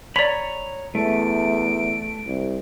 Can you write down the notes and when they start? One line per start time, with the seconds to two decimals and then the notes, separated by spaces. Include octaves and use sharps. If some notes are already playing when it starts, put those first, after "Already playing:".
0.16 C#5 D5 A#5 B5 B6
0.95 E2 A3 D7
2.27 C2